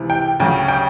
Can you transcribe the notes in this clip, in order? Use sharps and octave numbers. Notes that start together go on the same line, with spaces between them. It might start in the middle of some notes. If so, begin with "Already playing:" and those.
Already playing: C#2 C3 E3
G5
D2 C#3 F#3 G5
G5